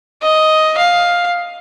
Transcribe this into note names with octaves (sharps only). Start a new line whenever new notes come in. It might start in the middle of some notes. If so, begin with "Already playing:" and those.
D#5
F5